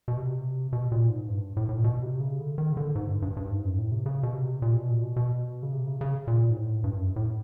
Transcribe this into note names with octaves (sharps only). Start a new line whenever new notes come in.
B2
C3
B2
A#2
G#2
G2
A2
A2
A#2
B2
C3
C#3
D3
D#3
C#3
D3
G#2
G2
G2
G2
G#2
F#2
A2
C3
C#3
B2
C3
A#2
B2
A#2
B2
B2
C#3
C3
C#3
C#3
A#2
G#2
A2
G2
F#2
A2